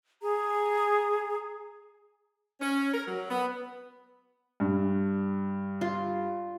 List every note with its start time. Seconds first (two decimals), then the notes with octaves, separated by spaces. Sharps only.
0.21 G#4 A#5
2.60 C#4
2.93 A#4
3.06 F#3
3.29 B3
4.60 G2
5.81 F4